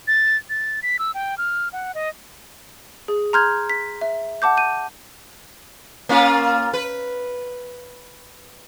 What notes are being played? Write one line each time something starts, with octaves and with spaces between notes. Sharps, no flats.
A6
A6
B6
E6
G5
F6
F#5
D#5
G#4
A#5 C6 F6 G6 G#6
B6
E5
F#5 A5 D6 G6
G6 D#7
A#3 C#4 F4
B4